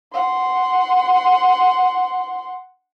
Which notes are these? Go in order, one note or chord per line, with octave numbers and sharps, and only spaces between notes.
F#5 C6